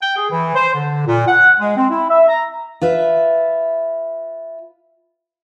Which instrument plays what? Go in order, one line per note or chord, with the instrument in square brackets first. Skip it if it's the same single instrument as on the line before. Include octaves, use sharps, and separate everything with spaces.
[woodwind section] G5
G#4
E3
C5
D3
A#2
F#5
G#3
C4
E4
E5
A#5
[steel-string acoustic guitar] F4 B4 E5